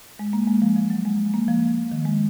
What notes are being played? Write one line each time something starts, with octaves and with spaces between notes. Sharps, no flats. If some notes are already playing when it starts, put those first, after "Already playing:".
G#3
A#3
G#3
F3
F3
F#3
G#3
A#3
F3
D#3
G#3